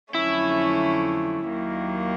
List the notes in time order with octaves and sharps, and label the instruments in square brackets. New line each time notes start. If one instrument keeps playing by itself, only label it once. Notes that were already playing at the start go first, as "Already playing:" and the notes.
[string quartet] F2 D3 F#3 A3 C#4 [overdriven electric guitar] E4
[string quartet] D#2 D#3 F#3 A#3